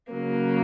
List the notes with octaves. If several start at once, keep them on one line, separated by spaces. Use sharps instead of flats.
C#3 F#3 A#3